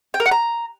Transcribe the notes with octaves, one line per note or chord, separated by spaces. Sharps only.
G5
A#4
F#5
A#5